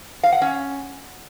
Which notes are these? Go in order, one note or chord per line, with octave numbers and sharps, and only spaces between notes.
F5
F#5
C#4